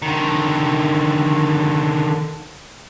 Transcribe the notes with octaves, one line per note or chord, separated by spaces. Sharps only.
D3 D#3